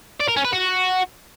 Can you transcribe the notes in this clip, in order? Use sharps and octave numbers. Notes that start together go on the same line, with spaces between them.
D5
A#4
C#4
B4
F#4